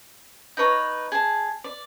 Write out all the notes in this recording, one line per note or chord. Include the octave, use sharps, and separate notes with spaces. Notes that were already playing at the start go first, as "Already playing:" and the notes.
D#4 B4 C#5 A#5
G#4 A5
D5